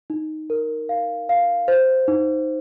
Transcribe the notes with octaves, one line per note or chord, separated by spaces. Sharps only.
D#4
A#4
F5
F5
C5
D#4